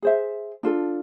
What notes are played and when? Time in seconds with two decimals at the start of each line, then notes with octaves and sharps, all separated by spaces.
0.02 G#4 C5 E5
0.63 D4 F4 A4